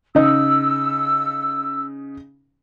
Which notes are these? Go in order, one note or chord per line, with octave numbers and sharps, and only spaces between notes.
C#3 D#4 E6